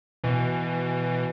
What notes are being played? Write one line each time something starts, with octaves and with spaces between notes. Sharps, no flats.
B2 E3